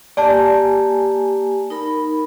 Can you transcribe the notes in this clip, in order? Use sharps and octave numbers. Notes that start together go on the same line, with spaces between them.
A#3 G4 D5 G#5 A5
D#4 A#4 B5